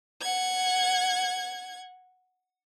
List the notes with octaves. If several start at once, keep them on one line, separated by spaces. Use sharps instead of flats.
F#5 G#6